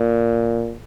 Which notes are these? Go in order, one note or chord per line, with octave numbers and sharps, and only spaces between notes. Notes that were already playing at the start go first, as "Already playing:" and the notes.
Already playing: A#2